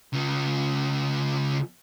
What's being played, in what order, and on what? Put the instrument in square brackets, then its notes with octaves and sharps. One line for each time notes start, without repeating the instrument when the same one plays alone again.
[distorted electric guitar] C#3 F4